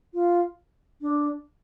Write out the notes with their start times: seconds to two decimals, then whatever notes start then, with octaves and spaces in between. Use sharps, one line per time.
0.14 F4
1.01 D4